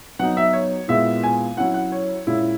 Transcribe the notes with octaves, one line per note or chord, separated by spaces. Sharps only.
F#3 B3 D#4 F#5
E5
C#5
A#2 G#3 B3 E4 E5
G#5
F#3 C#4 E4 F#5
F#5
C#5
A#2 G#3 C#4 E4